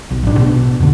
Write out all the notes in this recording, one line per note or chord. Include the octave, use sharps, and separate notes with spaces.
B1
A1 D4
B2
E2 D3